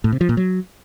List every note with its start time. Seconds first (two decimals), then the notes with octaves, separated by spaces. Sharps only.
0.04 A2
0.12 C3
0.21 F3
0.29 A#2
0.37 F#3